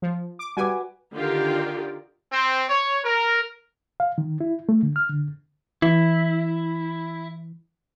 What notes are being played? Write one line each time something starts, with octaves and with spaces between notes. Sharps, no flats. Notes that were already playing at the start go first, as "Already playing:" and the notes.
F3
D6
G3 F#4 B4 G#5 D6
D3 D#3 F4 G4 A#4 D5
C4
C#5
A#4
F5
D#3
E4
A3
D3
F6
D3
E3 E4